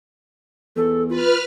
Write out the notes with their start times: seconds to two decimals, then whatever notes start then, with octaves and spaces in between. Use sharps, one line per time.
0.76 E2 A4
1.09 F4 B4 F6